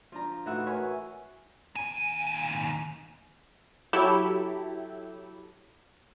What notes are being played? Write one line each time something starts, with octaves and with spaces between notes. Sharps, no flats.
F3 D4 A#5
A2 E3 D#4 F#4 F#5 E6
A#4 B4 C#5 F#5 G#5 C#6
D#2 G#5
F#3 E4 G4 A4